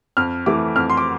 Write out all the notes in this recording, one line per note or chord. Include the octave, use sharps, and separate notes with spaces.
F2 F6
E3 A3 D6
F2 F6
C6
D6